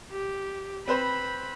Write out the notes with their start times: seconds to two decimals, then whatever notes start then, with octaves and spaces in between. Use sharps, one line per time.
0.12 G4
0.88 C4 B4 C5 B5